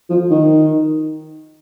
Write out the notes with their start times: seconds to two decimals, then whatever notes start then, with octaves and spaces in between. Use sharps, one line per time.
0.10 F3
0.30 D#3